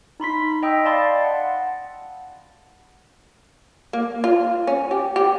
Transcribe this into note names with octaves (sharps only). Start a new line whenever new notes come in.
D#4 B5 C6 B6
D#5 G5 D#6 E6
D5 F5 A5 B5 C6 A6
F#5
A#3
F4
C#4
G4
G4